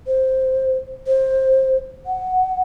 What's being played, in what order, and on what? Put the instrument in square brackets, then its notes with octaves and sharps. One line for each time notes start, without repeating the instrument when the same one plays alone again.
[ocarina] C5
C5
F#5